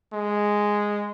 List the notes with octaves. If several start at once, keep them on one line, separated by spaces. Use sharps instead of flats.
G#3